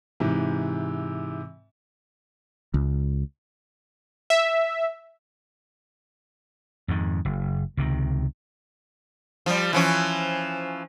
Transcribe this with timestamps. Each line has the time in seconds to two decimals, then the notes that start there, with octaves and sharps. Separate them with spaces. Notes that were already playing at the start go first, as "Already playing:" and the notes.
0.20 G#2 C3 E3
2.74 C#2
4.30 E5
6.88 F2 G#2 D#3
7.25 F#1
7.77 C#2 C3 D#3
9.46 F3 G3
9.73 E3 F3 C#4